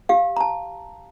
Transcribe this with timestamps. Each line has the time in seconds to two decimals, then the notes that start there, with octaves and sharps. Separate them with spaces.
0.09 G4 F5
0.37 A#5
0.41 A5